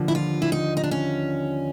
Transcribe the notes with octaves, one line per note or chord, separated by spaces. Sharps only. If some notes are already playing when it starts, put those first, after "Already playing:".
Already playing: D#2 D3 F3
E4
F4
E4
D#4
D#4
D4
C#4